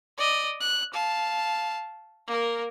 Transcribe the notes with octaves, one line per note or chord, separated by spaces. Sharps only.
D5 D#5
F#6
F5 A5
A#3 A#4